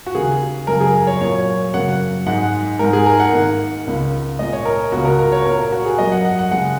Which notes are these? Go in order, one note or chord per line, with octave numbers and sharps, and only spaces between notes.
F#4
D#2 C#3 A#3 G#4
F#2 C#3 G#3 A#4
G#4
A#4
C#5
A#2 F#3 A#3 C#5
F#2 C#3 A#3 F#5
G#2 G#3 F#5
G#2 G#3 A#4
G#4
A#4
F#5
G#2 D#3 A#3
C#2 C#3 A#3
A#2 G#3 D#5
C#5
A#4
C#2 C#3 A#3 F#4
A#4
A#4
C#5
A#2 A#3 A#4
A#4
F#4
G#4
F#2 F#3 A#3 D#5
F#5
F#5
F#5
C#3 G#3 F#5